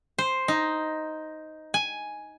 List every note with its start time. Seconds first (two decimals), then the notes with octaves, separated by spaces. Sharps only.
0.18 C5
0.48 D#4
1.74 G#5